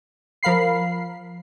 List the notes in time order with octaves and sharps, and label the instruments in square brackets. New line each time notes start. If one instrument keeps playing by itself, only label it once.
[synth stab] F3 A#4 F5 B5 C7